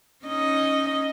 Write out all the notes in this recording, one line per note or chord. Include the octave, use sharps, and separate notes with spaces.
C#4 D#4 D#5